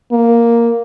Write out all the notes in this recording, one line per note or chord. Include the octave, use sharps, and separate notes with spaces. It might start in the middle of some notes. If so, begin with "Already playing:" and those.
A#3